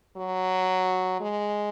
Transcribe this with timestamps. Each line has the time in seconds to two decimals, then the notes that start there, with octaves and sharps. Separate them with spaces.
0.16 F#3
1.20 G#3